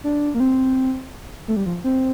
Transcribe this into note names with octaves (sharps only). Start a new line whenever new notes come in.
D4
A#3
C4
A3
G3
F3
C4